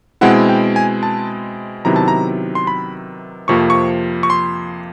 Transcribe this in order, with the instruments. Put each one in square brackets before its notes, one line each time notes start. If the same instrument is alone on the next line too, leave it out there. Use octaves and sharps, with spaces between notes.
[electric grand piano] B2 G#3 C4 E4 F#5
G5
G#5
A5
C3 D#3 F#3 B3 E4 A#5
A5
A#5
C6
B5
F2 C3 F3 A#3 C#6
C#6
C#6
C6